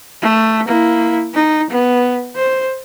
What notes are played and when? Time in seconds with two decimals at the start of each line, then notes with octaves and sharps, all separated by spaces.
0.22 A3
0.67 A#3 E4
1.34 D#4
1.70 B3
2.36 C5